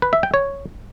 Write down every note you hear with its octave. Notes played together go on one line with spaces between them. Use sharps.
B4
E5
G5
C#5